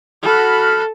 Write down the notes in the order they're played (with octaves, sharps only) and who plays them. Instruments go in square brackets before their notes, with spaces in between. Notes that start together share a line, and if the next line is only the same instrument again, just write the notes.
[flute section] F#4 B5 F6 [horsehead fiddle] A4